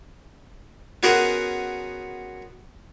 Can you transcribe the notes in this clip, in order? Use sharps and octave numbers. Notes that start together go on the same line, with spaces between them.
B3 C#4 F#4 G#4 A#4 C5